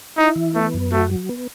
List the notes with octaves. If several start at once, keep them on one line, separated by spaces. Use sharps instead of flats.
D#4 E4
E3
A3 B3
F#2
A3 F#4
F#3
B3